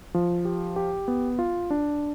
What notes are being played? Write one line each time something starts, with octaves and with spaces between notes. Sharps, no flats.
F3
G4
G4
B3
F4
D4